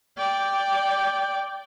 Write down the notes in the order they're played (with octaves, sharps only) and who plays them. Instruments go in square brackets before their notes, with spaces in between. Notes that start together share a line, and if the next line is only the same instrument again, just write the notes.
[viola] D5 G5